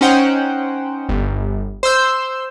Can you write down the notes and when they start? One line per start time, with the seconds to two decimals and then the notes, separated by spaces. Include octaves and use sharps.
0.01 C#4 D#4 C5 F#5 G5
1.09 G1
1.83 C5 C6 E6 G6